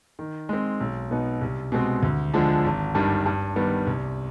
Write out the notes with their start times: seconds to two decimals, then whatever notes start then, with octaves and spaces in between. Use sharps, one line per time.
0.19 D#3
0.49 G#3 C4
0.80 B1
1.11 B2 B3 D#4
1.41 C2
1.72 B2 G#3 C4
2.03 D2
2.34 D3 F3 G#3 D4
2.64 G#1
2.95 G2 D#3 G3 D4
3.26 G2
3.56 D#3 G3 B3
3.87 C2